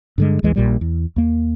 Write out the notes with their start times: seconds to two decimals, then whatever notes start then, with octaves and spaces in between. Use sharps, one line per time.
0.18 G2 D3 G#3
0.43 A1 D#2 E3 G#3
0.56 A#1 A#2 G3
0.81 E2
1.16 D#2 A#3